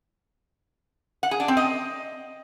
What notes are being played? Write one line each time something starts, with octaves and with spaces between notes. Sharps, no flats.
F#5
G#4
D4
C4
D#5